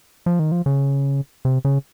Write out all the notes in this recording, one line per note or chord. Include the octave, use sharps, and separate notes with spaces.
F3
D#3
F3
C#3
C3
C#3